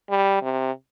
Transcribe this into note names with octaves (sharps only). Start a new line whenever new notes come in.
G3
C3